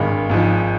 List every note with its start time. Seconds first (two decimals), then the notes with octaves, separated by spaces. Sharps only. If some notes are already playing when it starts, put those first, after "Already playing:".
Already playing: G#1 G2 D#3 G#3
0.29 G#1 G#2 F3